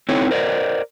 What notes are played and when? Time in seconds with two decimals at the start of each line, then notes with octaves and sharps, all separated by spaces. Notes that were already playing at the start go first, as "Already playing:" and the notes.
0.09 C4 D#4 E4 A4 C#5
0.31 A#4 C5 D5 D#5